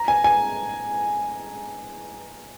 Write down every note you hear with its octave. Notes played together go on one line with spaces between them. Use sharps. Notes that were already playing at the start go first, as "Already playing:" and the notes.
Already playing: A#5
G#5
G#5